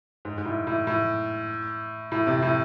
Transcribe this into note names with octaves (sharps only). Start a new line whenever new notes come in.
G#2
G#2
A2
A2
A2
A2
C3
A2